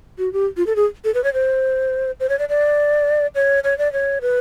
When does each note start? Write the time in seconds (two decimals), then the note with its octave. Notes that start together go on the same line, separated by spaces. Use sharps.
0.18 F#4
0.33 G4
0.57 F4
0.67 A4
0.76 G#4
1.04 A4
1.14 B4
1.24 C#5
1.34 C5
2.20 C5
2.29 C#5
2.39 D5
2.49 D5
3.35 C#5
3.64 C#5
3.78 D5
3.93 C#5
4.22 B4